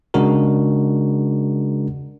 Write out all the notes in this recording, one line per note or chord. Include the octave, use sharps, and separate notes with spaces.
C#3 G#3 D4 F#4 A#4